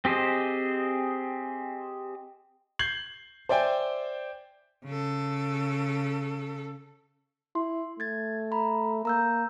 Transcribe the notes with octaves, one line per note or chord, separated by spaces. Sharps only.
C4 G4 G#4 C5 D#5
G6 G#6 C7 F#7
C5 D5 E5 G5 G#5
C#3 A4
E4 C6
A3 G#6 A6
A#5 B5
A#3 A#5 E6 G6